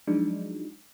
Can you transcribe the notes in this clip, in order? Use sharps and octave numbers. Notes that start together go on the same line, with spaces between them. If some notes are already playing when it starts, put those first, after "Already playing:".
F3 F#3 G#3 D4 D#4